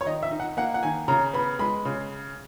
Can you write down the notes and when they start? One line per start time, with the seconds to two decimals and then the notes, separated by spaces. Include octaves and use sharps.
0.01 C#5
0.06 D#3 D#5
0.23 E5
0.31 D#4
0.40 F#5
0.57 A#3 F#5
0.74 F#5
0.83 D#3 G#5
1.08 C#3 A#5
1.33 B3 B5
1.59 G#3 B5
1.85 C#3